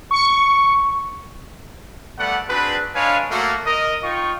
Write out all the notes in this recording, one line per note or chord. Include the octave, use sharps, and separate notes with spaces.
C#6
G3 A3 B3 D5 F#5
C4 D4 F#4 G#4 B4
G#3 D4 B4 C#5 F5 G#5
A3 A#3 F#4
A#4 D#5
D#4 F4 G5 C#6